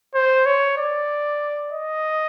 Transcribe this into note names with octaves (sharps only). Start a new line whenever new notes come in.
C5
C#5
D5
D#5